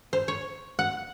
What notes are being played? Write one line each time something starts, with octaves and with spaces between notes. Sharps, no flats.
C5
C#5
F#5